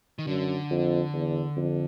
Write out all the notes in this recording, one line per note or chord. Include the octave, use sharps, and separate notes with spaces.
D#3
F#2 D3
F2
E2
F2